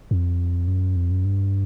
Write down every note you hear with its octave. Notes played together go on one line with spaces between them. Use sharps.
F2
F#2
F2
F#2
G2